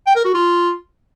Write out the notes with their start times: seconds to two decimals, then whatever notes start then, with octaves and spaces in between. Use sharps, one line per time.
0.07 G5
0.16 A#4
0.25 F#4
0.34 F4